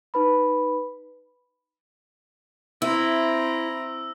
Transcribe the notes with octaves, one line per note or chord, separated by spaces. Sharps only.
D#4 B4 B5
C4 E4 A#5 E6